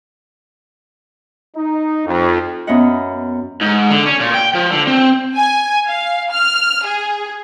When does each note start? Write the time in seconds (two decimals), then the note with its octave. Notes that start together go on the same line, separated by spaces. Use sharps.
1.55 D#4
2.07 F2
2.67 F#2 B3 C#4 D#5 E5 F#5
3.61 G#2
3.90 D3
4.06 C#4
4.20 A#2
4.34 G5
4.55 F3
4.71 D3
4.87 C4
5.36 G#5
5.86 F5
6.31 F6
6.86 G#4